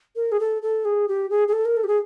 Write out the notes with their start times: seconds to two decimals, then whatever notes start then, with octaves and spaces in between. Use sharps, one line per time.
0.16 A#4
0.32 G#4
0.40 A4
0.62 A4
0.85 G#4
1.08 G4
1.30 G#4
1.48 G#4
1.53 A4
1.65 A#4
1.76 A4
1.84 G4
1.88 G#4